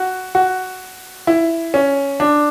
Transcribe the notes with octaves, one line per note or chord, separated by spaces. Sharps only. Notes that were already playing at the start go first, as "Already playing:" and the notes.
Already playing: F#4
F#4
E4
C#4
D4